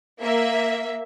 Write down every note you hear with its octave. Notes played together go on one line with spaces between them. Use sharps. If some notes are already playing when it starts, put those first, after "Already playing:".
A#3 E5